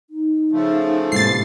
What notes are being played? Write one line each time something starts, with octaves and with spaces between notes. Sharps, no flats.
D#4
C#3 F3 A3
A1 G#2 C3 A#3 A6 C7